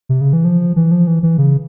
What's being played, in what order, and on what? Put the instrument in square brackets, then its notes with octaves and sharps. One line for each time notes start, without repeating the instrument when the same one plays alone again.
[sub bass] C3
C#3
E3
F3
E3
F3
E3
E3
C#3